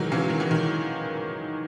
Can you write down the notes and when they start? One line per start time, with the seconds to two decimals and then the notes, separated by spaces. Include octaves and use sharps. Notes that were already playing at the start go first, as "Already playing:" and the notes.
Already playing: D#3 E3 F#3 G#3
0.12 C#3 E3
0.30 D#3
0.40 E3
0.51 D#3